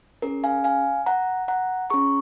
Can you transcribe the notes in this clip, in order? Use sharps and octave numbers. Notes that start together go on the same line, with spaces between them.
C#4 G#4 A#4
F5 G#5
F5 G#5
F#5 A#5
F#5 A#5
C#4 G#4 A#5 C#6